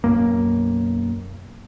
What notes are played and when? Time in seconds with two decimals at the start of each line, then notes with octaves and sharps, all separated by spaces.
0.04 B1 F#2 A#3